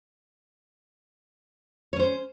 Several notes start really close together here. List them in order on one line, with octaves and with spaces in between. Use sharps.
C#5 C#4 C5